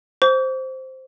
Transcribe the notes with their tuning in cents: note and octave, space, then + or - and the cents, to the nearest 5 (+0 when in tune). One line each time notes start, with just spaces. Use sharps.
C5 +0 D6 -45